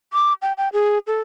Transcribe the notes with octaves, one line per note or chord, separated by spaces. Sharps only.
D6
G5
G5
G#4
A4